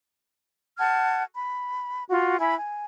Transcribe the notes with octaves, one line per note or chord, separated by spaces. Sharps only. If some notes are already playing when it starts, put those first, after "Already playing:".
F#5 A5 F6 G#6
B5
F4 F#4
E4 G#5 B5
G#5